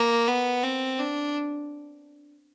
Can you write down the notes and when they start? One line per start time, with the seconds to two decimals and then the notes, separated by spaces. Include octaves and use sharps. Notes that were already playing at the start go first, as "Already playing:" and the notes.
Already playing: A#3
0.28 B3
0.63 C4
0.99 D4